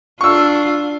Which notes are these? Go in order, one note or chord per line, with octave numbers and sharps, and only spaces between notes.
D4 F4 C#6 E6